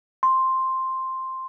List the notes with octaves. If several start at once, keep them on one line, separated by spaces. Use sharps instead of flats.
C6